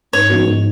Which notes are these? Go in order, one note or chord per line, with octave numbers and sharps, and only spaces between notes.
G#2 C#5
F3 B3 D#4 F#4
G#2